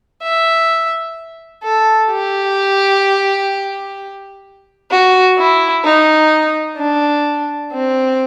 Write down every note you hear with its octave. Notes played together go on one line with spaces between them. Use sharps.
E5
A4
G4
F#4
E4
D#4
D4
C4